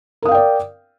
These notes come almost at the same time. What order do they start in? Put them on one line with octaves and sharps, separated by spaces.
A#4 D#6 F5 G5 D5